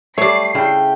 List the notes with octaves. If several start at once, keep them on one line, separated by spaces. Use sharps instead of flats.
G3 A3 C#5 D5 C7
C#3 A3 E4 G5